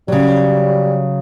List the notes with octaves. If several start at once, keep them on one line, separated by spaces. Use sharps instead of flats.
C#3 F#3 G3